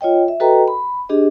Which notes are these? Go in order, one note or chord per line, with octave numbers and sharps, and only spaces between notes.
F4 C#5 D#5 G5
E5
F#4 A4 B4 D#5 G5 A#5
B5
D4 G4 G#4 D#5